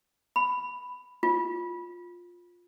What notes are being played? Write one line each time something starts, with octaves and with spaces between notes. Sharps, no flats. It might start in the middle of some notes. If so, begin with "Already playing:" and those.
B5
F4